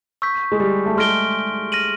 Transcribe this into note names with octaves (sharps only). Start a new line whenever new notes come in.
C#6 E6 G6 B6
G#3
G3
A3
G#3 C6 F6 A#6 D7 G7
F6 A#6 D#7 F#7